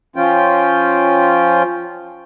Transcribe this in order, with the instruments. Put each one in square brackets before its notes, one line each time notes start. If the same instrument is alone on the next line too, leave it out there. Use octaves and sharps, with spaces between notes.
[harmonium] F3 C#4 F4 G5